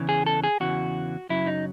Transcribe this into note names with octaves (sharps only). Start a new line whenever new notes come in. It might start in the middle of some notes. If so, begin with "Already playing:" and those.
Already playing: E2 C#3 E3
G#4
A4
G#4
E2 C#3 E3 F#4
F#2 C#3 F#3 E4
D#4